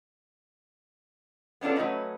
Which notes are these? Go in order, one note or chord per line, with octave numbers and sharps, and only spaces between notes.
B3 C#4 D4 F4 A4
F#3 A3 C4 C#4 B4 D#5